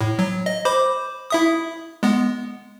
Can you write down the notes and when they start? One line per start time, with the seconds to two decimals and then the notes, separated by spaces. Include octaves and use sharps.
0.01 A2
0.19 F#3
0.46 D#5
0.65 C5 B5 D6
1.30 E4 E5 D#6
2.03 G#3 B3